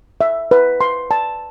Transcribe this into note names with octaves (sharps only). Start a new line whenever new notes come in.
E5
B4
C6
A5